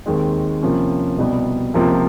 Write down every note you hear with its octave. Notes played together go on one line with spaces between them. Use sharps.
D#2 D#3 G#3 C4
C3 F3 A#3 C#4
C2 B2 G3 B3
C#2 C3 F3 A#3